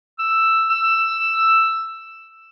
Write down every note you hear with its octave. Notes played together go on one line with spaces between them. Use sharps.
E6
E6